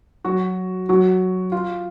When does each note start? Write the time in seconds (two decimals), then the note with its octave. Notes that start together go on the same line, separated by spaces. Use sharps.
0.24 F#3 F#4
0.89 F#3 F#4
1.52 F4